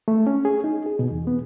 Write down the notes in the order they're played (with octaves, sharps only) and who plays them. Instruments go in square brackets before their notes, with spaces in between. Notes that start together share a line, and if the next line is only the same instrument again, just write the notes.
[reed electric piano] A3
C#4
G#4
D#4
G#4
B2
E2
B3